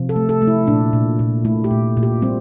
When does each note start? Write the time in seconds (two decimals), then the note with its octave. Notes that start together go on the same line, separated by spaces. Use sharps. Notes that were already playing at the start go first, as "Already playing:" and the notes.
Already playing: C3 F3
0.09 A4
0.16 A3
0.29 A4
0.42 A3
0.47 E4
0.67 A#2 D4
0.93 A#2
1.19 A#2
1.45 A3 E4
1.64 G4
1.71 A#2
1.97 A#2
2.03 G4
2.22 G3 C4